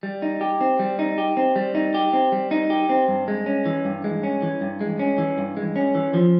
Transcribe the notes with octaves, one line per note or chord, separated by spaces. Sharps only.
G3
D#4
G4
C4
G3
D#4
G4
C4
G3
D#4
G4
C4
G3
D#4
G4
C4
G2
G#3
C#4
E3
G2
G#3
C#4
E3
G2
G#3
C#4
E3
G2
G#3
C#4
E3
F3